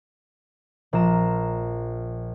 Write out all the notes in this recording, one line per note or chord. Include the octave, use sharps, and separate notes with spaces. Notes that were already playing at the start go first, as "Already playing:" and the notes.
A#1 F4 A#5 E7